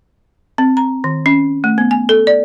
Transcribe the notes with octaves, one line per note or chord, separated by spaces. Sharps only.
C4
A#5
D#3
C#4
A3
B3
G#5
A4
D5